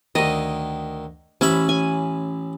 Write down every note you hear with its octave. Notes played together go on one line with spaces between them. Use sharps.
D2 D#3 D#5
A1 C#4 E5 B5
G#5